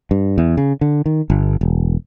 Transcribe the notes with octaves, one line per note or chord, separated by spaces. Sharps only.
G2
E2
C#3
D3
D#3
G1
E1